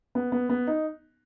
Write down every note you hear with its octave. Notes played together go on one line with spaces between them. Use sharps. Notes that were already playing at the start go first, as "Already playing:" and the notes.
B3
B3
B3
D#4